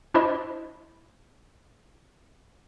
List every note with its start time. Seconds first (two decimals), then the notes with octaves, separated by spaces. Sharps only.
0.14 D4 E4 C5 D#5